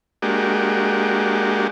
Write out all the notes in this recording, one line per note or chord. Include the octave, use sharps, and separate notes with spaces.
G#3 A#3 D4 F#4 G4